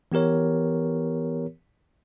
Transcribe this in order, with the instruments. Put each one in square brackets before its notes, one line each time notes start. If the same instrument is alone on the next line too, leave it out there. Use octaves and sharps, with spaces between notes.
[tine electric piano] E3 B3 G4 A#4 C#5